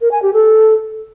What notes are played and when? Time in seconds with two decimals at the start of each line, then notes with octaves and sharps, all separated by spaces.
0.01 A#4
0.11 G#5
0.22 G4
0.33 A4